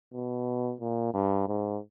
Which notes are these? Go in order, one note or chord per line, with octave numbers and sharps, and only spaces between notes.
B2
A#2
G2
G#2